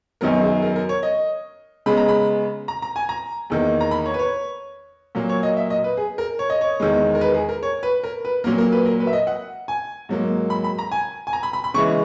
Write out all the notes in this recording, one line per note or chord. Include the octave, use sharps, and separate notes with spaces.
F#2 D#3 F#3 B3 A#4
G#4
A#4
A#4
C#5
D#5
C#3 G#3 B3 B5
A#5
B5
A#5
A#5
G#5
A#5
E2 D#3 A#3
A#5
B5
C#5
B4
C#5
A#2 F#3 A#3
C#5
D#5
E5
D#5
B4
G#4
A#4
C#5
D#5
C#5
E2 D#3 G#3
A#4
B4
G#4
A#4
C#5
B4
A#4
B4
A#2 F#3 A#3 A#4
A#4
B4
A#4
B4
E5
D#5
F#5
G#5
G#2 F#3 A#3
B5
B5
A#5
G#5
G#5
A#5
B5
B5
B5
C#3 E3 G#3 C#6